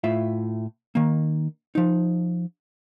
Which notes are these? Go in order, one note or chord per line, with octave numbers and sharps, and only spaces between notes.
A2 F4 E5
D#3 A#3
F3 D#4